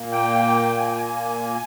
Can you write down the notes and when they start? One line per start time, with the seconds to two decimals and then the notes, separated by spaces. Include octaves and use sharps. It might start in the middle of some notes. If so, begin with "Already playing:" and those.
Already playing: A#2 A#3
0.12 G5
0.78 G#5
0.87 G5
0.96 G#5